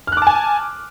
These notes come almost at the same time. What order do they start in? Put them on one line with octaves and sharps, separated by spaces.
F6 F#6 D6 A5 G#5